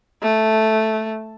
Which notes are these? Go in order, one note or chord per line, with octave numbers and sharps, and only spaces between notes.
A3